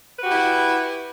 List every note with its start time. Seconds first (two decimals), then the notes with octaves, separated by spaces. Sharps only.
0.18 B4
0.22 F#4
0.26 G4
0.30 E4